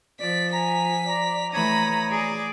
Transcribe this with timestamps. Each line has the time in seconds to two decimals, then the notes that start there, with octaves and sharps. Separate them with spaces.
0.20 F3 D5 B6
0.53 G#5 A#5 B6
1.08 D5 A#5
1.54 E3 A3 C#5 A#5 B5 D#6
2.10 G#4 D5